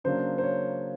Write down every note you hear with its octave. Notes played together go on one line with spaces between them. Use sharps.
C#3 F#3 A#3 D4 C5
C5
C#5